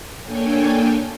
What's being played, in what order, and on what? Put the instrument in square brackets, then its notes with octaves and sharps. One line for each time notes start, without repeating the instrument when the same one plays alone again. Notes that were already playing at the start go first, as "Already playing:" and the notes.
[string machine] A#3 D4 A4 C#5 G5 G#5